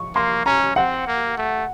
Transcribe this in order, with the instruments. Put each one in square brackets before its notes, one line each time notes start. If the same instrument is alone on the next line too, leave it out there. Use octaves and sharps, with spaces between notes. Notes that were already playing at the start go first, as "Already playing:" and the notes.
Already playing: [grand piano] C#6
[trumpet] A#3 [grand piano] C6
[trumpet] C#4 [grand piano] A#5
[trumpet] C4 [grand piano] F#5
[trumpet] A#3
A3